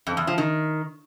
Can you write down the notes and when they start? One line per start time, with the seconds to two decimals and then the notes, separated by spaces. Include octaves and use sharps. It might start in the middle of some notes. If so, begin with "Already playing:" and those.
0.07 F2
0.17 E2
0.27 F3
0.38 D#3